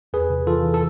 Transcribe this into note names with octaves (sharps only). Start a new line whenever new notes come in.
E2 G#4 B4
C3
E3 F4 A4
E3
A4